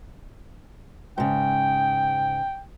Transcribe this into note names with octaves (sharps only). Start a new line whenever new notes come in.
G#2 C#3 G5